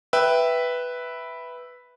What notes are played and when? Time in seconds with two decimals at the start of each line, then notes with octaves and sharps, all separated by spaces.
0.13 B4 E5 G5